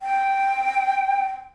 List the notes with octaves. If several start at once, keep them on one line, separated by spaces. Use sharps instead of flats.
G5